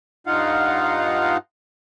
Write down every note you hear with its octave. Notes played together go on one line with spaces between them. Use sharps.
G2 D#4 F4 F5 F#5